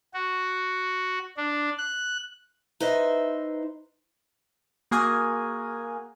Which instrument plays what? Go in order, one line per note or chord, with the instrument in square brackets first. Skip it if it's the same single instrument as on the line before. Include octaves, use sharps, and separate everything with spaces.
[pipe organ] F#4
D4
F#6
[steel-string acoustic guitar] D#4 B4 C5 D#5 E5
[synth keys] A#3 F#4 G#4 A#4 G#5